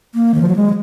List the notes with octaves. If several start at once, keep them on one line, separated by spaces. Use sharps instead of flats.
A#3
D#3
F3
F#3
G#3